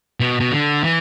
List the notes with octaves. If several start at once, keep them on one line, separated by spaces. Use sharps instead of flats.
B2
B2
D3
E3